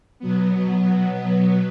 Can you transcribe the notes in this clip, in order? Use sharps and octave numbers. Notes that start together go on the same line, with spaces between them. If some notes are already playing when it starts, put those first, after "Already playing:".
B2 F#3 B3